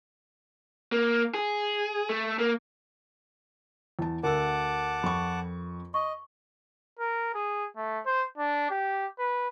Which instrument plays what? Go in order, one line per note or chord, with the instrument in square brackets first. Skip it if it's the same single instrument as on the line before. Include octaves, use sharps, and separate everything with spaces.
[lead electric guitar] A#3
G#4
A3
A#3
[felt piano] E2 A5
[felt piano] D2 [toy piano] A#4 E6 [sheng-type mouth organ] F#5 A5 D6
[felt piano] F2 C#6 [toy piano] B5
[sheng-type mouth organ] D#5 [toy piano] C#6
[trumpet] A#4
G#4
A3
C5
D4
G4
B4